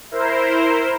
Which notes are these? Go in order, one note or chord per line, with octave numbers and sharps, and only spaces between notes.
E4 A#4 C5